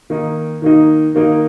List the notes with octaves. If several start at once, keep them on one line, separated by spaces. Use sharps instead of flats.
D#3 A#3 D#4
D#3 A#3 D#4
D#3 A#3 D#4